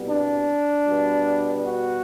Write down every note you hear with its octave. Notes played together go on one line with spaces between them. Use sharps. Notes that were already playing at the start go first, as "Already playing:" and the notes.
Already playing: C2 B2 G3 B3
D4
B2 G3 B3
F#4